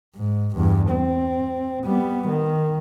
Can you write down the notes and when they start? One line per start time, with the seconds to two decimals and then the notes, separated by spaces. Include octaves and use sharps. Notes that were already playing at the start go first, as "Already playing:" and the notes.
0.16 G#2
0.56 E2 G2
0.91 C4
1.85 G3 B3
2.28 D#3